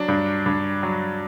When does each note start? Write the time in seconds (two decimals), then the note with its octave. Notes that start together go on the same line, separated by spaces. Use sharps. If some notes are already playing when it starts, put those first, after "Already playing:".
Already playing: F#3 D4
0.08 G2
0.46 G2
0.83 F#3